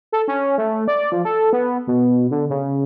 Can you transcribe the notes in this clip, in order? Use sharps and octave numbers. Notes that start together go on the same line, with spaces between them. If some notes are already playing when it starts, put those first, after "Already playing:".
A4
C#4
A3
D5
F3
A4
B3
B2
D3
C#3